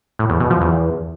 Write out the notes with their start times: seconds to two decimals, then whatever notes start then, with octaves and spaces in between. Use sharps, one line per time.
0.19 A2
0.30 E2
0.40 B2
0.50 F3
0.61 E2